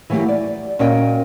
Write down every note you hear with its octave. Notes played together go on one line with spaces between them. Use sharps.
E3 F#3 A3 A#3 G4
D5
A#2 C#4 F#4 A#4 D#5 G5